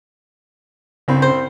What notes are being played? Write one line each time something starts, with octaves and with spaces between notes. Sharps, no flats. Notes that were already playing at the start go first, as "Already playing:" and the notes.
C2 G2 C#3 C4
C5